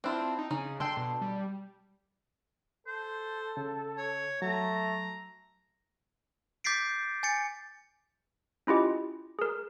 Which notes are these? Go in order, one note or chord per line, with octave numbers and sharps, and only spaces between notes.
C4 D4 E4 F4
D#4
C#3 D#4 G#4
D4 A4 G5 C6
B2
G3
A4 C5
C#3
C#5
F#3 A3 A#5
D6 G6 A6 B6 C7 D7
G#5 A6 C#7
C#4 E4 F4 G4 D#5
G#4 A#4